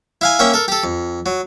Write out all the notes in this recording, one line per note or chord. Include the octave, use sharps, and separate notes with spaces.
E4 F5 G#5
A#3 C#4 E5 G5
A4 A#4
G4 A4
F2
F#3